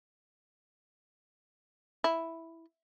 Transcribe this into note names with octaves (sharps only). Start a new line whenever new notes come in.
E4